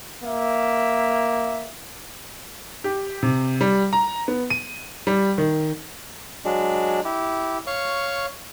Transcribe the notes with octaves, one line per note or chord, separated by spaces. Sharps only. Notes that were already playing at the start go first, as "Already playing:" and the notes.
A#3 E5
G4
C3
G3
A#5
B3
D#7
G3
D#3
F#3 G#3 D4
E4 G4
C#5 F5 C#6